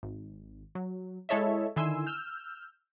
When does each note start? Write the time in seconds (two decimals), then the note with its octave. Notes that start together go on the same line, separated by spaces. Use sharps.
0.03 G#1
0.75 F#3
1.29 G#3 E4 A4 C#5 D#5 E5
1.76 D3 D#3 E4 G#5 C6 E6
2.06 E6 F6 G6